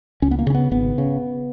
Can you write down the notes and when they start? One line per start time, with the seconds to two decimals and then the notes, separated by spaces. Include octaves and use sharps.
0.22 C#2 C#4
0.31 B3
0.39 A#3
0.47 C#3 C#4
0.55 B3
0.71 G#1 B3
0.98 C#3